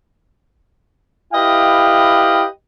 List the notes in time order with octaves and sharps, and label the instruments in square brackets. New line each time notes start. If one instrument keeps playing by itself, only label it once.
[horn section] E4 G4 B4 D#5 F5 G5